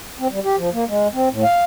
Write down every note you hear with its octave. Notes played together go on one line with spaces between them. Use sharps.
C4
G3
G4
F3
A#3
G#3
C4
A2
F5